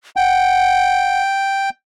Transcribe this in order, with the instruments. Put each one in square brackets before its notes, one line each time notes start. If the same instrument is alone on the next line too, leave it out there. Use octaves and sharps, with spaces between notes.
[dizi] F#5 [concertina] G5